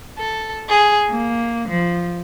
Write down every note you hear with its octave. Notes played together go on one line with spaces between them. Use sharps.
A4
G#4
A#3
F3